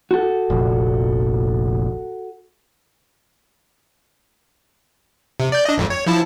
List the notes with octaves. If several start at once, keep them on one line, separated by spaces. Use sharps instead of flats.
F#4 A4
F1 A#1
C3
D5 G6
D4 D#5
G#1 F2 G#2
C#5
F3 E4 A5